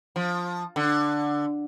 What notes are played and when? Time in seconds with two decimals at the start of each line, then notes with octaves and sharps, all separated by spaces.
0.16 F3
0.76 D3